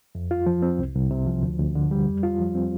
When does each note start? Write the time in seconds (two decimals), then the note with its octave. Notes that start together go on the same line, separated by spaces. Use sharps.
0.15 F2
0.31 F4
0.46 F3
0.62 C4
0.79 C2
0.95 C2
1.11 C3
1.26 F3
1.43 D2
1.59 D2
1.75 D3
1.91 G3
2.07 F2
2.23 F4
2.39 F3
2.55 C4